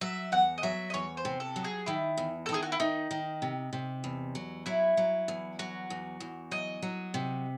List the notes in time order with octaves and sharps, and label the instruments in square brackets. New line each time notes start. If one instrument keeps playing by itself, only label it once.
[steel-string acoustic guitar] F#3 [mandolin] E5
[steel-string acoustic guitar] E2 [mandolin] F#5
[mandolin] D#5
[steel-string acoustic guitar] F#3 [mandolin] E5
[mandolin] D#5
[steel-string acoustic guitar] E2 [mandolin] C#5
[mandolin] C5
[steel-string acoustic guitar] C3
[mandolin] A4
[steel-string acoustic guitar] F#3
[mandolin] G#4
[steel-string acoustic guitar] D#3 [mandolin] E4
[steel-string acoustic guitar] E2
[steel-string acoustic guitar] D#3 [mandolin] A4
[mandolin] G#4
F#4
E4
[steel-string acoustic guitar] D#3 [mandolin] D#4
[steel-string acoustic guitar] D#3
C3
C3
E2
F#3
[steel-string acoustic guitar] F#3 [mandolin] E4
[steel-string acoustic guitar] F#3
E2
[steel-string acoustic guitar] F#3 [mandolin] F#4
[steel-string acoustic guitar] E2
E2
[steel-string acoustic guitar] F#3 [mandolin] D#5
[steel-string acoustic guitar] F#3
C3